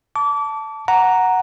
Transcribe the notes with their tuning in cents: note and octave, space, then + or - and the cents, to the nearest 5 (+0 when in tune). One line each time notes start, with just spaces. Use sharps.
A5 +0 D6 -30
F#5 +0 A#5 +0